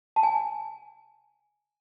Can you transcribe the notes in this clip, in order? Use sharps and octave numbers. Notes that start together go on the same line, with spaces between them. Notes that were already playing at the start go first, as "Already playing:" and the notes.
A5
G#5